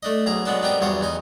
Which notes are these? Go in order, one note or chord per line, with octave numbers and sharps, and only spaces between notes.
A3 D4 D#5
B1 G#4 A#5
F#3 G#3 B3 D4 A5
B3 C4 D4 D#4 G4 A#4
E2 G2 F#3 C5 C#5 D#6
E2 D#4 G#5